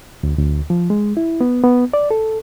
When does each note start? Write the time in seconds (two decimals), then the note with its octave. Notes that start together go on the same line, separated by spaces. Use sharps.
0.23 D2
0.39 D2
0.70 F3
0.90 G#3
1.17 E4
1.41 B3
1.64 B3
1.94 D5
2.11 A4